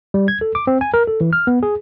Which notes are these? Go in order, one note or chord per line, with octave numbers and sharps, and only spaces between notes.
G3
G#6
A4
D6
C4
G#5
A#4
A4
E3
F6
B3
G#4